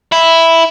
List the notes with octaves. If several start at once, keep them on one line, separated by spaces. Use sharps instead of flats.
E4